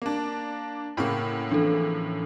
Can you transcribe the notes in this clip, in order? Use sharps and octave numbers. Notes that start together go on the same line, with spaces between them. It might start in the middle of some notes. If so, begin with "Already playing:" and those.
A#3 D4
A2 C#3 A#3 F#5 G5 C#6
E3 F3 C4 D4 A4